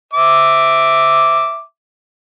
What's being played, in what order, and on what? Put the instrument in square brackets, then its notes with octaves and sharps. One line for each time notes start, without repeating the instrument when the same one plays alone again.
[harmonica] E5 D6